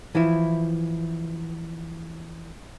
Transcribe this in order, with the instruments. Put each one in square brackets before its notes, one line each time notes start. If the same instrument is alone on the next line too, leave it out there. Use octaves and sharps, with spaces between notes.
[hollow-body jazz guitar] E3 F3 E4